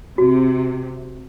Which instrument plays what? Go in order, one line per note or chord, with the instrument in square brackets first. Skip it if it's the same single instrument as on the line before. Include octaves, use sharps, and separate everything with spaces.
[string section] C3 [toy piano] F#4